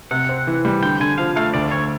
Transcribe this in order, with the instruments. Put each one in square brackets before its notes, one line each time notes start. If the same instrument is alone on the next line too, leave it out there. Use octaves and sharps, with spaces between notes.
[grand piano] C3 [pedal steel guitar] F#5
[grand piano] C4
E3
G3
[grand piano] D3 [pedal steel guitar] G5
[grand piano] D3 [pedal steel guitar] G#5
[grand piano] F3 [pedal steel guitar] F5
[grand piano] A3 [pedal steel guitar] F5
[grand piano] D2 [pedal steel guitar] D5
[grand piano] D2 [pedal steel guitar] C#5